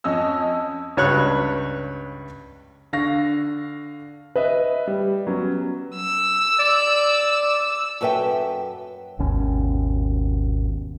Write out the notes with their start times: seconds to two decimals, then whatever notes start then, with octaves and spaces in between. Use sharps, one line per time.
0.04 F2 C#4 D#5 E6
0.97 C#2 G2 C#5 C#6 F#6
2.93 D3 F5 C#6 A#6
4.36 B4 D#5 E5
4.87 G3
5.27 F#3 B3 C#4
5.95 E6
6.59 D5
8.01 F#2 A4 B4 E5 G5
9.19 G#1 D#2 B2 C#4